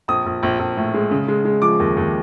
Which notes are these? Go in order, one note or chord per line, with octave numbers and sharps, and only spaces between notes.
A#1 D#6
A#1
A#1
A#1
A2
G#3
C#3
G#3
G#3
F3 D6
D#2
D#2